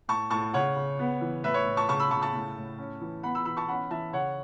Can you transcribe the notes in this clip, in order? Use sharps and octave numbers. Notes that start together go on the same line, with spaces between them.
A2 A5 C#6
A2 A5 C#6
C#3 C#5 F#5
C#3
B3
E3
A2 B4 E5
C#5
A2
A5 C#6
C#3 A5 C#6
B5 E6
C#3 A5 C#6
A5 C#6
A2
A2
C#4
E3
B3 F#5 B5
B5 E6
E3 B5 E6
A5 C#6
C#4 F#5 B5
E3 E5 A5
C#3 C#5 F#5